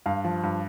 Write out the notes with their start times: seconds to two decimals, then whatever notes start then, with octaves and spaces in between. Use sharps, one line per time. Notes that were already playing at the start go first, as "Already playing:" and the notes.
0.06 G2 F5
0.25 F3
0.43 G2